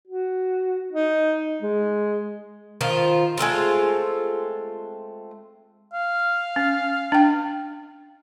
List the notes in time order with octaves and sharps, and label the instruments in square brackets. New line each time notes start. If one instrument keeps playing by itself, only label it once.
[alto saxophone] F#4
D#4
G#3
[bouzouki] D#3 F3 F4 C5
G#3 A3 C4 F4
[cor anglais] F5
[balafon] C#4
D4 G5